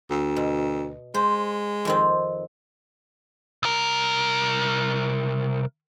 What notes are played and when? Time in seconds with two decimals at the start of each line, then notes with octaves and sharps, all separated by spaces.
0.10 D2
0.36 B2
1.14 G#3 C5
1.85 F2 D#3 C4
3.63 C2 A#4